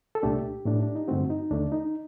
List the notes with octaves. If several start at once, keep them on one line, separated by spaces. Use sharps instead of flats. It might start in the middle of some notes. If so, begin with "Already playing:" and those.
A4
C2 A#2 A3 D4 G4
A2 A3 D4
D4
D#4
G2 D3 A3 C4 F#4
D#4
D#2 D3 A3 D4
D#4